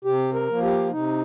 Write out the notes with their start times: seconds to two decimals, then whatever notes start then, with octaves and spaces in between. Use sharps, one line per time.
0.05 C3 G4
0.34 A#4
0.48 F3 A#3
0.62 G4
0.91 C3 D#4